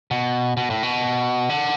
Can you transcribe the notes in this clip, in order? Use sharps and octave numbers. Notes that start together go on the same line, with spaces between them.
B2
B2
A2
B2
D3